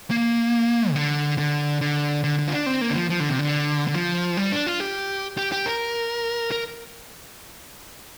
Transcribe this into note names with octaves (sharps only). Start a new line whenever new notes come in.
A#3
C3
D3
D3
D3
D3
D3
F4
D4
C4
A#3
D3
F3
F3
D3
C3
D3
D3
F3
G3
D4
F4
G4
G4
G4
A#4
A#4